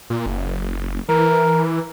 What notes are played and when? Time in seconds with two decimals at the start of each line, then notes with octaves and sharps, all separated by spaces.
0.10 A#2
0.26 F#1
1.09 E3 A#4